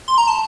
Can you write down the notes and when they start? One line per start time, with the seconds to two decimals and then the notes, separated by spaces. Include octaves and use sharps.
0.08 C6
0.18 A#5
0.28 A5